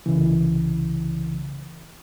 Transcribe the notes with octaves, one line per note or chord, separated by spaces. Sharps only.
C2 C#3 E3